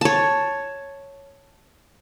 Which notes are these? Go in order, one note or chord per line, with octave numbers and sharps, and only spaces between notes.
C#5 A5